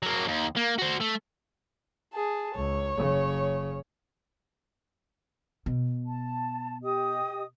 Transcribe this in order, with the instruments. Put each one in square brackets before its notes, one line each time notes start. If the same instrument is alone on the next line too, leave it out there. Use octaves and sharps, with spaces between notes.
[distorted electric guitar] F#3 A#3
D#2
A#3
F#4 C5
A3
[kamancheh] G#4 A5
[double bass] C#2 [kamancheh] C#5
[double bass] F#1 C#3
[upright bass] B2
[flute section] A5
G4 D#5 D#6